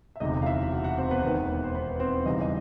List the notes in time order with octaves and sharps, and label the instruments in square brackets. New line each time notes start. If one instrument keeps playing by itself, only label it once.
[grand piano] E5
E1 D2 C3 D#4 D#5
F5
E4 E5
F#4 F#5
F#4 F#5
C4 C5
B3 B4
E1 D#2 D#3 B3 B4
C5
B3 B4
C4 C5
E2 C#3 E3 G3 D#4 D#5
D#5